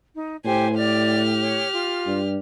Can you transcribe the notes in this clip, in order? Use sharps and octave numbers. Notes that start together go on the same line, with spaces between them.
D#4
A2 G4 C5 G#5
G4 D5 F6
C#5
F4
G2